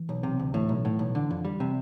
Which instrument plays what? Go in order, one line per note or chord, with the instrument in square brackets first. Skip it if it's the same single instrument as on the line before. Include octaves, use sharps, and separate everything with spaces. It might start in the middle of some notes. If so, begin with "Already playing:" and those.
Already playing: [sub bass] E3
[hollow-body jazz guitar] B1
C3
D2
[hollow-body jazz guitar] A2 [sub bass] E3
[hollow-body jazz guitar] B1
A2
B1
[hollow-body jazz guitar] D3 [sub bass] E3
[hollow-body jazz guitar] F2
G3
C3